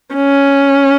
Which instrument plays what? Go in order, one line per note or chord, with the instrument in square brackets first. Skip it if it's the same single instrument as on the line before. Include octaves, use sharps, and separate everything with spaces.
[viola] C#4